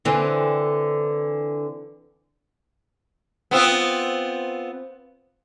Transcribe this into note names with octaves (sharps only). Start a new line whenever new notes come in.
D3 E3 C4
B3 C4 F4